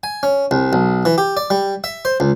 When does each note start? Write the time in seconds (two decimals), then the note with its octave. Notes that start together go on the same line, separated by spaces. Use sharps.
0.04 G#5
0.23 C#4
0.51 C2
0.73 B1
1.05 E3
1.18 G4
1.37 D5
1.50 G3
1.84 E5
2.05 C5
2.20 C#2